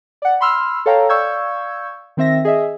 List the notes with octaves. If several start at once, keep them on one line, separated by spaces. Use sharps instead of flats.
D5 F#5
B5 C6 E6 F6
A4 C#5 F5 G5 A#5
D5 F5 C#6 E6 G6 G#6
D#3 C4 E5 A#6
G#4 D#5 E5